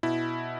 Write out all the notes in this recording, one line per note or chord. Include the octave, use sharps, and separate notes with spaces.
B2 E4